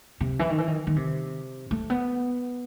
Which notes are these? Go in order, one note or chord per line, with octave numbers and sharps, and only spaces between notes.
C3
E3
D#3
E3
D#3
D#3
C3
A3
B3